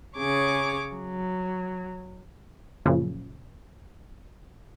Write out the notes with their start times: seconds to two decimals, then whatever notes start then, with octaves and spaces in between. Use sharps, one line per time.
0.16 C#3 G#4 C#5 D6
0.94 F#3
2.85 F#2 A#2 C#3 F3